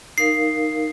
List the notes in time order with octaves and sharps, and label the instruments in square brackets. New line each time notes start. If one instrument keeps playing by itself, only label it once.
[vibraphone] D#4 A#4 F5 [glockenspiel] C7